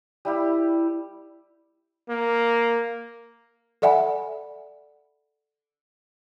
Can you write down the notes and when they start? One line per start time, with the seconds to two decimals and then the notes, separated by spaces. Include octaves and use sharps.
0.25 G3 E4 G4
2.09 A#3
3.82 A4 D5 E5 F#5 G#5 B5